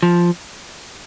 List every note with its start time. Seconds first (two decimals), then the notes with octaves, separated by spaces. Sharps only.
0.03 F3